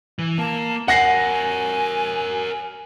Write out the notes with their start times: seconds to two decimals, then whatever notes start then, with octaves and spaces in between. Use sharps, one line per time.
0.19 E3
0.38 A#3 A5
0.88 A#4 C#5 F#5 G#5 A#6 C7